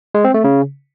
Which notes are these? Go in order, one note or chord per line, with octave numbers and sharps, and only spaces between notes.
G#3
C4
A3
C#3